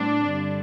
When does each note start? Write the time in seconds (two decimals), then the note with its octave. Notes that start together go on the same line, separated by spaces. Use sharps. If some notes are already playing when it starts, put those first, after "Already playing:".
Already playing: A2 G3 C4 D4
0.31 G2 D3